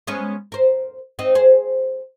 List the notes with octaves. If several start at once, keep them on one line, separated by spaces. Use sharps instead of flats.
G#3 B3 C#4
A#4 C5
C4 D#4
G#4 C5